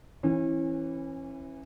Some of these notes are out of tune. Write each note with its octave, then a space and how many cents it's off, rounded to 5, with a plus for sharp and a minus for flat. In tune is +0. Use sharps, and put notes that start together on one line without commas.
E3 +0 C#4 -35